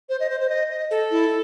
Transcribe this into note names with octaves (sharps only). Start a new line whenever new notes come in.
C5
D#5
C5
C5
D#5
D#5
A4
E4